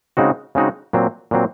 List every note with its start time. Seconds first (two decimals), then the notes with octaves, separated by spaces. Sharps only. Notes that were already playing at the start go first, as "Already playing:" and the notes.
0.17 C#3 G#3 C4 D#4 F#4
0.55 C#3 G#3 C4 D#4 F#4
0.93 A#2 F#3 C4
1.31 A#2 F#3 C4